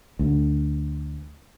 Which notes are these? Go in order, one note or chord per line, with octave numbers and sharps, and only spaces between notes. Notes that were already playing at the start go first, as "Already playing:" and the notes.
D2